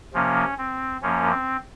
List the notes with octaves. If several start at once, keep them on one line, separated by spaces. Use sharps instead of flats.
C3 F3 A#3 C#4
C4
F#2 F3 A#3 C#4
C4